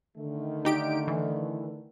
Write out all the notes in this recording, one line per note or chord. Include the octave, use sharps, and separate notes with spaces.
D3 D#3 A3
D#4 G4 D7
E3